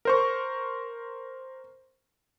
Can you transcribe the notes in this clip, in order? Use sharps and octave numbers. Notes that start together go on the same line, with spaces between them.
A#4 C5 C#6